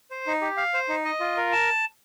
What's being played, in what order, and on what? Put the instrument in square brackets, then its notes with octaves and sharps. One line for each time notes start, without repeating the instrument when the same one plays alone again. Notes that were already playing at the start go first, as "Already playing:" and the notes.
[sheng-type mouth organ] C5
D#4
G4
F5
C5
D#4
D#5
F4
A#4
A5